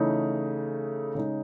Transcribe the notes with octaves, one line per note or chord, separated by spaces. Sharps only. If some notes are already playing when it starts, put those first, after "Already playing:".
Already playing: C#3 E3 A3 D#4
C#3 G#3 D#4